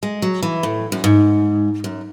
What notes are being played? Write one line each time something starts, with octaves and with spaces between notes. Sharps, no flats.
G#3
F#3
E3
A2
F#2
G#2
F#2